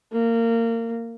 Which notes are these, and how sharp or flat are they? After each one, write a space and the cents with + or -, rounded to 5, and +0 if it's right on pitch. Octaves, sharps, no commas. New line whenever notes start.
A#3 -25